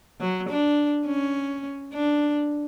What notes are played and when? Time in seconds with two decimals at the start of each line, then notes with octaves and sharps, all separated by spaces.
0.20 F#3
0.49 D4
1.06 C#4
1.93 D4